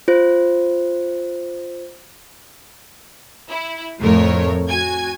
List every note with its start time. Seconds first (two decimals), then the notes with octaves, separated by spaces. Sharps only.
0.08 F4 C5
3.49 E4
3.99 F2 A2 A3 A#4 C#5
4.69 F#4 G#5 G#6